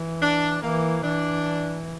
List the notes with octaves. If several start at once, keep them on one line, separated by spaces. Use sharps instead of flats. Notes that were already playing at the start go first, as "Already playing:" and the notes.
Already playing: E3
D4
E3 A#3
E3 D4